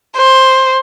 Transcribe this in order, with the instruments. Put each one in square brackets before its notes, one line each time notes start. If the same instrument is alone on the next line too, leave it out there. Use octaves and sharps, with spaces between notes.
[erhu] C5